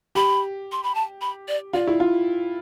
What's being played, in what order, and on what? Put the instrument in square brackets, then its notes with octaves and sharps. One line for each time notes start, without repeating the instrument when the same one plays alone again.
[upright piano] G4 [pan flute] B5
[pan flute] C6
B5
A5
B5
D5
[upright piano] F4 [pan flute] D5
[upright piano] E4
F4